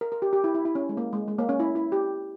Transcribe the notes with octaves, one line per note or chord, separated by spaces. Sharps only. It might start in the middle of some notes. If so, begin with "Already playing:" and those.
A#4
A#4
G4
G4
E4
E4
E4
C#4
G#3
A#3
G#3
G#3
A#3
C#4
E4
E4
G4